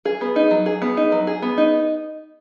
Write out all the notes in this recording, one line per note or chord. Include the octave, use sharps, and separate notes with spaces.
G#4
B3
D#4
F#3
G#4
B3
D#4
F#3
G#4
B3
D#4